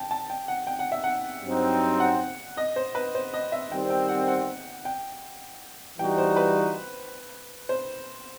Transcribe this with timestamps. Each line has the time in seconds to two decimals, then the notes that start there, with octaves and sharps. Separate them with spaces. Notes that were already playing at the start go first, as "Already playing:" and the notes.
Already playing: G5 A5
0.11 A5
0.30 G5
0.48 F#5
0.67 G5
0.79 F#5
0.92 E5
1.04 F#5
1.43 G2 F#3 C4 D#4
2.00 F#5
2.57 D#5
2.76 C5
2.95 B4
3.15 C5
3.34 D#5
3.52 E5
3.72 D#3 G3 C4 G5
3.90 G5
4.09 F#5
4.28 F#5
4.85 G5
5.98 E3 G3 D#4 F#4 G5
6.18 C5
6.37 B4
7.69 C5